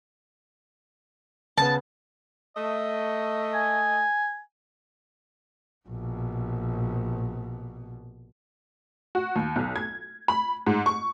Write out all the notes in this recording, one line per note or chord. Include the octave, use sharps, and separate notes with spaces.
C#3 B3 A5
A3 D#5
G#5
A#1 B2
F#4
D#2
B1
G#6
B5
G#2
C#6